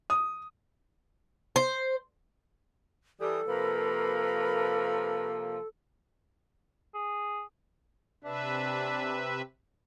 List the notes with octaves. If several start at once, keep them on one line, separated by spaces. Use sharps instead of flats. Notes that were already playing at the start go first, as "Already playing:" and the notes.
D#6
C5
E3 G3 A4 D#6
C3 F3 A#3 A#4 B4 B5
G#4
C3 D4 B4 E5